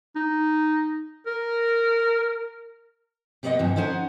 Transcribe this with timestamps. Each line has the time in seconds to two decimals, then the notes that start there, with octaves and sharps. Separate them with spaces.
0.16 D#4
1.26 A#4
3.43 C3 G3 B3 B4 D#5 F#5
3.59 G2 E3 F3
3.76 C#4 D#4 E4 C5 F#5 G#5